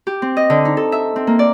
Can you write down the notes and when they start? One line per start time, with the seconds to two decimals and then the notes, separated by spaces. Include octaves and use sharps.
0.07 G4
0.22 C4
0.37 D#5
0.50 D3
0.65 D#4
0.77 A4
0.92 E5
1.16 C4
1.27 A#3
1.39 D5